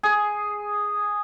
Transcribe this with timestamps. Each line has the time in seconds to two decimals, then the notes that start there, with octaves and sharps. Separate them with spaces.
0.03 G#4